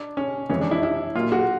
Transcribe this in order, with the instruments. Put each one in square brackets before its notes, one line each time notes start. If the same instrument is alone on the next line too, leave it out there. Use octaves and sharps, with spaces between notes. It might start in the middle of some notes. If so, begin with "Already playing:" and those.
Already playing: [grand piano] D4
C#4
[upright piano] F2 C#3 E3 G#3 [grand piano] C#4
[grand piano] D4
E4
E4
[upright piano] A#2 F#3 A#3 [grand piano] F4
[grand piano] F#4